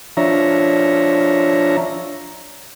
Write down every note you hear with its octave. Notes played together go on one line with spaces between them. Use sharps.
F3 D4 C#5 E5 A#5